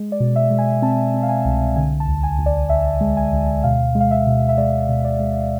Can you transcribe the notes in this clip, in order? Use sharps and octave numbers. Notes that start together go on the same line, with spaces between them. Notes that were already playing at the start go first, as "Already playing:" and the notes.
Already playing: G#3
D5
B2
E5
G#3
G#5
C4 A5
C4
F5
G#5
C2
D3 G#5
A5
D2
G#5
D2
D5
D2 E5
G#3
G#5
D2
B2 F5
G#3
F5
E5
B2
E5
G#3 D5
B2
D5
G#3